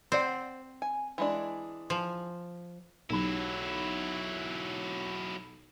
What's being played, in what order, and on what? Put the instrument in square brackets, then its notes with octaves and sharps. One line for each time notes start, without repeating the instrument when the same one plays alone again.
[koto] C4 [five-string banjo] C5 D5 F#5
[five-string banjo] G#5
E3 G#3 D4
[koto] F3
[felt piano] B1 G4 B5 [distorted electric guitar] F#3 E4